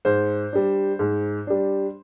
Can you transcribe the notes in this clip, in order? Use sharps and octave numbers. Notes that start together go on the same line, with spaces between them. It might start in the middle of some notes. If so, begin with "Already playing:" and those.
G#2 C5
G3 D4
G#2
G3 D4